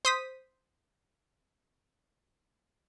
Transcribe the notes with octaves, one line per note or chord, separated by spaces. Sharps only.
C5 D#6 B6